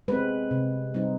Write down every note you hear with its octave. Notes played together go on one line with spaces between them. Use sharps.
G#3 C4 B4
C3
G3 C4 D#4